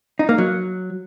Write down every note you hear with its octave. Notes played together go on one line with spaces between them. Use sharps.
D#4
A#3
F#3